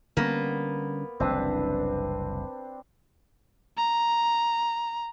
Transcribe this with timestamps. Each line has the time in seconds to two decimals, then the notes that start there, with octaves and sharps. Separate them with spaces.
0.17 D3 G3 A#3 B3 C#4
1.20 F#1 C2 E3 C4 D4 B4
3.77 A#5